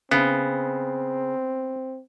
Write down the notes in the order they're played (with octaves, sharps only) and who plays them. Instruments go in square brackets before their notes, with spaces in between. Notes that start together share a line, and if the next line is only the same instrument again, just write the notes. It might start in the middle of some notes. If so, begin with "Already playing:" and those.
[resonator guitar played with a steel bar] C#3 [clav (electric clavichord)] B3 [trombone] C4